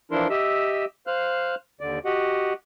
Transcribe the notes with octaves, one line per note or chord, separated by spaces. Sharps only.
E3 F3 D4 E4 A#4 C6
G4 D#5 E5 E6
C5 F5 F6 F#6
D#2 D3 D5
F#4 G4 D#5 F#5